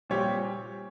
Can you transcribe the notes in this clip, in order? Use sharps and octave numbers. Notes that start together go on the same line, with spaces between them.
A#2 G3 C4 G4 C#5